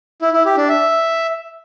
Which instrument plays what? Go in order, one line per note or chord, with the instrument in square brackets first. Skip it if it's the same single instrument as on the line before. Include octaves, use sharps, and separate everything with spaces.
[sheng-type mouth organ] E4
E4
G4
D4
E5